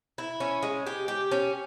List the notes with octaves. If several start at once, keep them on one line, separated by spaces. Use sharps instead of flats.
E4
C#4
G#3
G4
G4
C#4